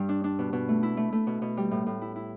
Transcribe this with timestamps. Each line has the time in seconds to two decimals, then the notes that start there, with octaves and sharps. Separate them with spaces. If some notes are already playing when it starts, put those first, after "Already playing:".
Already playing: G2 G3
0.09 D4
0.24 D4
0.39 B2
0.53 B2
0.69 A3
0.83 E4
0.97 A3
1.12 A3
1.27 B2
1.42 B2
1.57 G3
1.71 A2
1.86 A2
2.01 E4
2.16 E4